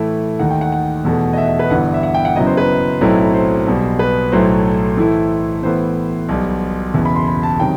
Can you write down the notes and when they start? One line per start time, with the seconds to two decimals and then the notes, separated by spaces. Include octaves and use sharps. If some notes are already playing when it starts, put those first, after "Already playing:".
Already playing: A2 E3 A3 E4 E5
0.39 D#2 D#3 A3 D#4 F#5
0.50 G5
0.61 F#5
0.72 F#5
1.05 E2 B2 A3
1.33 D#5
1.38 E5
1.48 D#5
1.59 B4
1.70 G1 G2 E3 G3 B3 F#5
1.94 E5
2.03 F#5
2.14 G5
2.25 F#5
2.36 F#1 F#2 F#3 B3 E4 D#5
2.46 C5
2.57 B4
3.01 B1 A2 F#3 C4 E4
3.34 C5
3.66 B1 B2 G3
3.99 B4
4.32 B1 A2 F#3 A3 E4 C5
4.98 A2 E3 A3 E4
5.63 A2 E3 B3 C5
6.29 B1 B2 G3
6.94 F#1 E2 B2
7.05 B5
7.15 C6
7.27 B5
7.43 A5
7.60 C3 D#3 F#3 G5